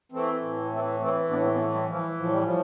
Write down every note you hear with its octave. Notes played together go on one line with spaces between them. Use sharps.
E3 A3 C4
A2
E3 A3 C4
E3 A3 C4
A2 B3 D4
A3 C4
B3
E3 F3 A3
G3
E3 F3
A2 F3
G3
F3
A2